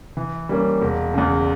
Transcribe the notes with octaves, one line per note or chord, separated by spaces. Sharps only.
E3
G3 A#3 C#4
E1
E2 C#3